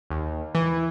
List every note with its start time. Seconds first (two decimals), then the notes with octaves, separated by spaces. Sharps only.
0.10 D#2
0.55 E3